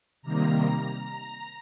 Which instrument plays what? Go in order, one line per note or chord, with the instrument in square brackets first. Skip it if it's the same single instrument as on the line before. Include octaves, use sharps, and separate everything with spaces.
[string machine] C3 D#3 G3 A#3 A#5